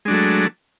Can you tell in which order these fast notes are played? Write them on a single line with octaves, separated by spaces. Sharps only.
G#3 D4 F#3 A3